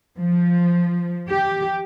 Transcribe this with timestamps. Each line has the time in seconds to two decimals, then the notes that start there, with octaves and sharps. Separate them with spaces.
0.18 F3
1.30 G4